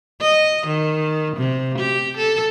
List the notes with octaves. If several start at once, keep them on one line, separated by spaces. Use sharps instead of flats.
D#5
D#3
C3
G4
A4